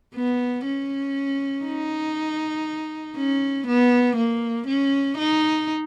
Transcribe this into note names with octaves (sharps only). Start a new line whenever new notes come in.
B3
C#4
D#4
C#4
B3
A#3
C#4
D#4